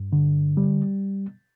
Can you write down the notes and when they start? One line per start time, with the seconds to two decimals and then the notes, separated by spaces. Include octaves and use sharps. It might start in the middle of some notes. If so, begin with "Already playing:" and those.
Already playing: G2
0.13 D3
0.57 G3